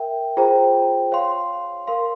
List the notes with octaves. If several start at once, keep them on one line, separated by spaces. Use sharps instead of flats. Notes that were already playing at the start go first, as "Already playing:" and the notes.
Already playing: A#4 E5 G5
F4 G#4 C5 G5 A#5
C#5 F5 C6
A#4 F5 C6